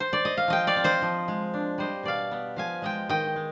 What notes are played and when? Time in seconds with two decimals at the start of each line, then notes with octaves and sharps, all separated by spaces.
0.00 C5
0.13 D5
0.25 D#5
0.37 F5
0.48 F3 D#5 G5
0.67 D5 F5
0.76 C4
0.84 C5 D#5
1.02 F3
1.28 G#3
1.54 D4
1.78 G3 C5 D#5
2.03 B2 D5 F5
2.31 B3
2.56 F3 F5 G#5
2.82 G#3 D#5 G5
3.09 D#3 D#5 G5
3.36 G#3